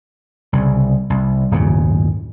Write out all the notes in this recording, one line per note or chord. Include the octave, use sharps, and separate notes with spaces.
C2 C#3
C2
D1 G1 D#2 C#3